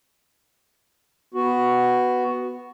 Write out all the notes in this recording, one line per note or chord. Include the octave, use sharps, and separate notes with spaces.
B3 F#4